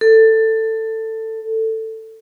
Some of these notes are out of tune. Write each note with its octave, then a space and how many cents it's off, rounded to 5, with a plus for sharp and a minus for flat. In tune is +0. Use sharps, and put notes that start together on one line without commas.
A4 +15